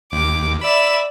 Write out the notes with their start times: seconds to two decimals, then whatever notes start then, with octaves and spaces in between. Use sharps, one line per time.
0.12 D#2 D6
0.61 D5 E5 B5 E7